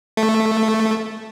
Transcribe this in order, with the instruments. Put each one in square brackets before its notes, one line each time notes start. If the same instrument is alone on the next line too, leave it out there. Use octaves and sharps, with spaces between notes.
[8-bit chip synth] A3